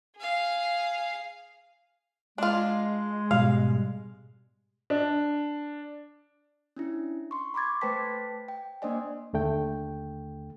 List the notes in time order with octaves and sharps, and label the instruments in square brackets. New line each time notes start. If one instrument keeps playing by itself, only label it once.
[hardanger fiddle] G#4 F5
[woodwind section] G#3 [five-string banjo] D4 F4
[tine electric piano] G#2 B2 G3 [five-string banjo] F5
[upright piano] D4
[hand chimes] C#4 D4 E4
C6 C#6
B5 C6 D6 G#6 A6
A3 B4 C5 G5 A5 B6
G5
A#3 D4 C5 D5 D#5 G#5
[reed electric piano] D#2 D3 A3 G5